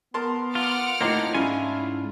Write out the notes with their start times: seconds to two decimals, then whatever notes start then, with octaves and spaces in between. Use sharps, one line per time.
0.14 B3 A#4 A5 C6
0.55 F4 F#5 D6 F6
1.01 A2 A#3 C4 D#4 F4 G4 A#5
1.34 G#2 C#4 D4 E4 F4 G#5